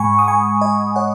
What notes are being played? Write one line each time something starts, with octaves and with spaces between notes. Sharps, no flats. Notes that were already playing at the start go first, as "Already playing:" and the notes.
Already playing: G#2 G#3 F#5 G#5 B5 C#6
D#6
G#5 C#6
D#5 G#5
C#5 F#5